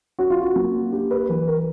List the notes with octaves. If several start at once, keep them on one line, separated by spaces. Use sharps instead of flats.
C#4 F#4
F4
F#4
A#3
D4 G4
B4
E3 B4
A#4